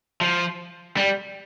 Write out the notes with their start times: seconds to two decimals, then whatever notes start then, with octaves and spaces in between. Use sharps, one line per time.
0.21 F3
0.97 G3